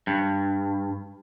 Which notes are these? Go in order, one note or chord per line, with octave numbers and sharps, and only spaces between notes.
G2